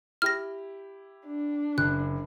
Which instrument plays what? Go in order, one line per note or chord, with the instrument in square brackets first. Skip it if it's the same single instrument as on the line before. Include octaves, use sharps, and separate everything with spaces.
[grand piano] E4 G4 [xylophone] F6 A#6
[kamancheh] D4
[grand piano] F#1 [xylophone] F#6